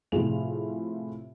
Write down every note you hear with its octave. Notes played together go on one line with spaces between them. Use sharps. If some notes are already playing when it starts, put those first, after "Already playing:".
A2 C3 F3 F4 G#4 F7